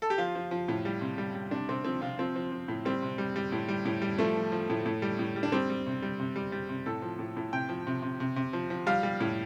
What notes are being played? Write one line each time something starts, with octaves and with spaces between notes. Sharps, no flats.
A4
G4
F3 F4
F3
F3
A2
G3
C3
G3
G3
C3 D4
C3 C4
F3 C4
C3 F4
F3 C4
F3
F3
A2
G3 C4
C3
G3
G3
A2
G3
A2
G3
F3 A3
F3
F3
A2
A2
G3
A2
G3
D4
G3 C4
G3
C3
G3
C3
G3
G3
C3
A2 A4
F3
A2
A2
C3 G5
F3
C3
C3
C3
C3
F3
F3
G3 F5
G3
A2